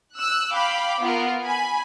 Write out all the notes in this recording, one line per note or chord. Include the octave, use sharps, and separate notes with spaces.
E6 F#6
F5 G5 B5 D6
B3 F4 A#4
G#5 B5